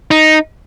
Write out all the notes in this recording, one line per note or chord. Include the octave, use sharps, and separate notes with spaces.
D#4